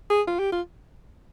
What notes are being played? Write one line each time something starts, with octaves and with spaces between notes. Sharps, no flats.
G#4
F4
G4
F4